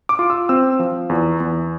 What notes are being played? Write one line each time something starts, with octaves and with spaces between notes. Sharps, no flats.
D6
F4
E6
C4 E6
F3
E2
E2